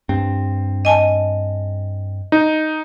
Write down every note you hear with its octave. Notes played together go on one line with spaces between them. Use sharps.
G2 C4
D#5 G#5 A5
D#4